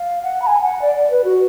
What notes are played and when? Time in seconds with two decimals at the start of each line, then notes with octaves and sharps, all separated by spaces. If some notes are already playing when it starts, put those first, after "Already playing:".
Already playing: F5
0.23 F#5
0.42 B5
0.47 G#5
0.62 F#5
0.82 D5
0.96 D5
1.11 B4
1.24 F#4